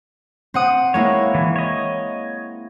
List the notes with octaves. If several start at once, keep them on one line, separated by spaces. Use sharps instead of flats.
C4 F#5 D#6
G#3 A#3 E4 C#5
E3
C#5 D#5